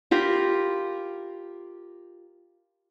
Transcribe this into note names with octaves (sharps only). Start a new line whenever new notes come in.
F4 G4 A#4 B5